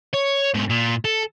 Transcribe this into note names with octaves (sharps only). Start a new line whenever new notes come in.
C#5
G#2 B2
A#2
A4